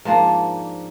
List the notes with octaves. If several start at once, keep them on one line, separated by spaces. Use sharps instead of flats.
G#2 F3 A#3 D4